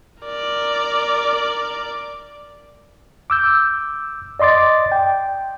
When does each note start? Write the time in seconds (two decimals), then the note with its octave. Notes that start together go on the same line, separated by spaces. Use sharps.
0.24 A#4 D5
3.30 D6 E6 G6
4.40 D5 D#5 C6 D6 A6
4.92 G5